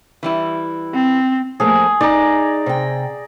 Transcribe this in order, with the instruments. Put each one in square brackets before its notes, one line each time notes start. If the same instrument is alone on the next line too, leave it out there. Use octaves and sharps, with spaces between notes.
[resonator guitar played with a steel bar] E3 G3 E4
[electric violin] C4
[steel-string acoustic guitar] F3 A3 A#3 [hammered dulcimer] G#4
[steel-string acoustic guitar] D#4 [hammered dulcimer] D5 A#5
[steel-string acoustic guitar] C3 G5